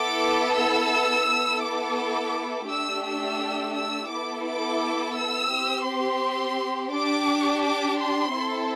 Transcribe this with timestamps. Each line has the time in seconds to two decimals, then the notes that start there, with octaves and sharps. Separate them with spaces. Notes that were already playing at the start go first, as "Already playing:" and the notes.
Already playing: B3 E4 A4 D6
0.58 E6
1.29 B3 E4 A4
1.64 D6
2.69 A3 D4 G4 E6
3.05 E6
3.75 E6
4.10 B3 E4 A4 D6
4.45 D6
5.16 E6
5.51 C4 G4
5.86 C6
6.91 D4 G4 D6
7.62 D6
7.98 C6
8.32 C4 E4 A4